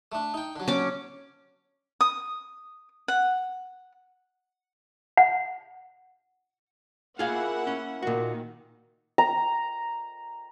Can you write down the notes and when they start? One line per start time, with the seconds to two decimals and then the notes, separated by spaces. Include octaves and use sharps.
0.12 A3 D4
0.34 D#4 G5
0.56 D3 F#3
0.68 C#4 D6
2.01 D#6
3.08 F#5
5.17 F#5
7.19 A#3 E4 F4 G#4 F5 F#5
7.67 C#4
8.02 A#2 D#3 F#4
9.18 A#5